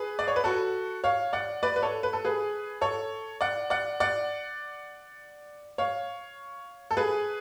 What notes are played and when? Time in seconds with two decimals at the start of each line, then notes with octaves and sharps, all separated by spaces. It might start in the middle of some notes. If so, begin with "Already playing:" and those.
Already playing: G#4 B4
0.19 D5
0.28 C#5
0.36 B4
0.44 F#4 A4
1.04 C#5 F5
1.33 D5 F#5
1.63 B4 D5
1.76 B4
1.82 A4 C#5
2.03 B4
2.13 A4
2.25 G#4 B4
2.81 A4 C#5
3.41 D5 F#5
3.70 D5 F#5
4.00 D5 F#5
5.78 C#5 F5
6.91 A4
6.97 G#4 B4